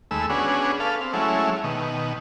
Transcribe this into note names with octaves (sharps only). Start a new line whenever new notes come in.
D#2 G#3 A3 B5 E6
B3 C#4 D4 F#4 G#4
A4 B4 F5
C4
F#3 G#3 A3 C#4 E4
B2 D#3